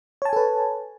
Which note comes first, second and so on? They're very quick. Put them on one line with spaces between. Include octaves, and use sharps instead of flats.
C#5 A5 G#5 A4 B4